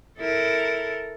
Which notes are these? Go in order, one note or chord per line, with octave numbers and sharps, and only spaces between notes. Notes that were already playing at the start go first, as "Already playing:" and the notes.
E4 A4 A#4